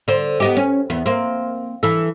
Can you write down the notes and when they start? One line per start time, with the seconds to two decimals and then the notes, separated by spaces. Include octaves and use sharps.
0.08 D3 C5
0.40 B3 D#4 G4
0.57 C#4
0.90 E2 B3
1.06 A#3 C4
1.83 E3 A4